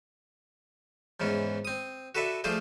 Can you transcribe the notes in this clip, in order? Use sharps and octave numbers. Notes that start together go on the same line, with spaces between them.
E2 G#2 E3 C#4
C4 D#6
F#4 A4 B4 D5 E5
F3 A3 F4 G#4 C5 D5